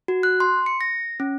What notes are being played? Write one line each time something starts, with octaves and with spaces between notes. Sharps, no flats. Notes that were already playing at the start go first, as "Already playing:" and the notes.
F#4
F#6
C6
C#7
A#6
C#4